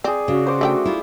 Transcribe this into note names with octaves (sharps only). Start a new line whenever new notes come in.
C4 G#4 D5
C#3 F#4
C5 C6 D6
D3 A3 E5 G5
E4 F4